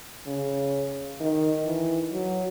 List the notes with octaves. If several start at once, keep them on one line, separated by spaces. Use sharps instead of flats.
C#3
D#3
E3
F#3